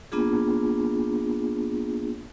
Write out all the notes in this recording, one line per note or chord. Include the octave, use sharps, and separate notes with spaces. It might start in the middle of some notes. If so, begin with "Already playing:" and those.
A#3 B3 D4 F4 G#4